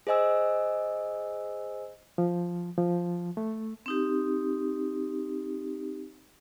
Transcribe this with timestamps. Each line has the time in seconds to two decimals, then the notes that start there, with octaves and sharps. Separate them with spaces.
0.07 G#4 C5 D#5 G#5 E6
2.18 F3
2.78 F3
3.37 A3
3.86 C4 D#4 G4